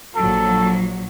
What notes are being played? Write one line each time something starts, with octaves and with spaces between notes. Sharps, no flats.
A#1 F#3 A4